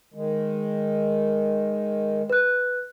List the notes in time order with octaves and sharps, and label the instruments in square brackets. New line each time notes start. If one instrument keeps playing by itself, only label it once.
[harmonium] D#3 G#3
[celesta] B4 F#6